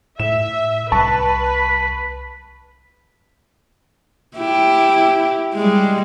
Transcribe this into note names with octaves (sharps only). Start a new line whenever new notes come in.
A2 E5 E7
C2 B4 A5 B5 C#6
E4 G4
G3 G#3